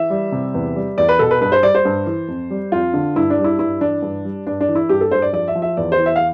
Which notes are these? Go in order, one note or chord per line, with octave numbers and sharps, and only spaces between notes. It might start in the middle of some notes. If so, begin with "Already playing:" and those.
Already playing: E3 E5
G3
C3
E2
G3
E2 D5
B4
B2 A4
B4
G2 B4
C5
G3 D5
C5
G2
E3
F2
G3
F2 F4
D3
G2 E4
D4
G3
E4
G2 E4
E3 D4
G2
G3
G2 D4
D4
E3
E4
G2 G4
A4
G2 C5
D5
F3 D5
E5
F3
E5
E2 D5
C5
E3
E5
F5